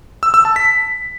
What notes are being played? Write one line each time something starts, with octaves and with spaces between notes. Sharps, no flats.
E6
E6
A5
B6